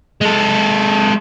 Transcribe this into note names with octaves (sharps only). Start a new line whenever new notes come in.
G#3 A4